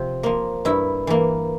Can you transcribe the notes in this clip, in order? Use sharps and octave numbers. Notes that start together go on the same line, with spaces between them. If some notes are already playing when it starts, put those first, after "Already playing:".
Already playing: C3 F3
F3 A#3
G2 E4
E3 A#3